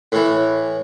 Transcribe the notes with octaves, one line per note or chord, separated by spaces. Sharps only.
A2 E3